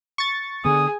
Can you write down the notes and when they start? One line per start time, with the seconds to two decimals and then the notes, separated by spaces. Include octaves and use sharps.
0.18 C#6 A6
0.65 D3 B3 G#4 D#6